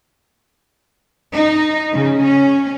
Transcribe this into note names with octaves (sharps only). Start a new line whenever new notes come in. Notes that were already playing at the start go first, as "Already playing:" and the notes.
D#4
C#3
C#4